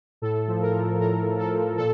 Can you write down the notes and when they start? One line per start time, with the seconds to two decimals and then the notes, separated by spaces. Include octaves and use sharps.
0.22 A2 A4
0.48 F3
0.62 A#4
0.74 F3
1.00 A2 A#4
1.26 A2
1.39 A4
1.52 F3
1.78 A#2 A4